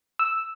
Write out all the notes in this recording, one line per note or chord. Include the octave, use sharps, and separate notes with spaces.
E6